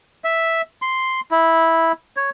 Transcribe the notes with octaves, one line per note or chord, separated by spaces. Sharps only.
E5
C6
E4
C#5